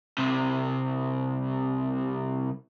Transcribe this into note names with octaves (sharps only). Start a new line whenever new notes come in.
C2 C3